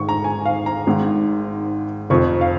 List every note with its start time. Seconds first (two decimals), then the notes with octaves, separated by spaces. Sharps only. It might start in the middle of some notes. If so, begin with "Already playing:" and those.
Already playing: G#1 G#2 D#3 C#6
0.09 A#5
0.24 G#5
0.45 F5
0.66 A#5
0.87 G#1 G#2 D#3
2.10 F1 F2 F3 C#6
2.41 F5